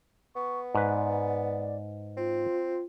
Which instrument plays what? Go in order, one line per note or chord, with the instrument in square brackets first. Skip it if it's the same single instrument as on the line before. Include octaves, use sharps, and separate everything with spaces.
[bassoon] B3 [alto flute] C#6
[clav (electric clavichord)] G#2 B4 [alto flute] D5
[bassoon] C4 [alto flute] F4